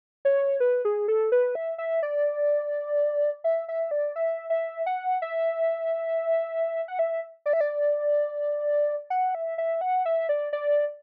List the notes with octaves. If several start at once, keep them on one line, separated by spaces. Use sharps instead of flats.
C#5
B4
G#4
A4
B4
E5
E5
D5
E5
E5
D5
E5
E5
F#5
E5
F#5
E5
D5
E5
D5
F#5
E5
E5
F#5
E5
D5
D5